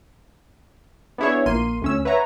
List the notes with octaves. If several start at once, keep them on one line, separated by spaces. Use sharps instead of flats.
B3 D4 E4 G#4 C#5
A#1 A#3 C6 D#7
D2 C#4 E6
B4 C#5 E5 F#5 A#5